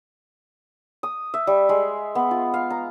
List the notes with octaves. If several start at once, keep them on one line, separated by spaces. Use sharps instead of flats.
D#6
E5
G3
G#3
B3
F4
F5
A#5